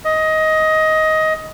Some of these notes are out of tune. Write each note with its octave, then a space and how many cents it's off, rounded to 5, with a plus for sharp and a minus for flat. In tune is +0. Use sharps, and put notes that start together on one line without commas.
D#5 +15